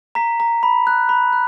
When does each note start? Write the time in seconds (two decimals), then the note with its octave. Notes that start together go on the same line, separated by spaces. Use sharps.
0.15 A#5 B6
0.40 A#5
0.63 B5
0.87 F#6
1.09 B5
1.33 F#6